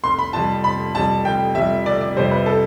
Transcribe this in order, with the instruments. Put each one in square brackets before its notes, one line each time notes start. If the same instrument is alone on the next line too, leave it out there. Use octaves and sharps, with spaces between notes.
[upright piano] F1 [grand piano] C6
[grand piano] B5
[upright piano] F2 C3 G3 [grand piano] A5
[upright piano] F1 [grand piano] B5
[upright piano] F2 C3 G3 [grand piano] A5
[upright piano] F1 [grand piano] G5
[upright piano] F2 C3 G3 [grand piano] E5
[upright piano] F1 [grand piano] D5
[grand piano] D5
[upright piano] F2 C3 G3 [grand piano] C5
[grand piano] B4
A4